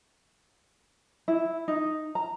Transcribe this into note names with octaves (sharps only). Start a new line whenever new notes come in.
E4
D#4
A#5